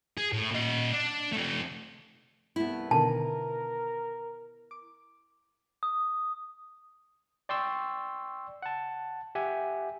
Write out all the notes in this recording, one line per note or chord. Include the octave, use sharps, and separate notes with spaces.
G#4
A2
A#2 D#5
D4
C3 A3
C2 A3 B3 E4
B2 D3 D#3 A#4 A5
D6
D#6
D5 G5 C6 C#6 E6
F#5 A5
G4 E5 F#5 G#5